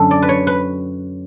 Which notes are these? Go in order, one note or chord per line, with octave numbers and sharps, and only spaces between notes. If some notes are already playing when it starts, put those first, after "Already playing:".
Already playing: F#2 D3 F#3 A4
D5
B4
C#5
B4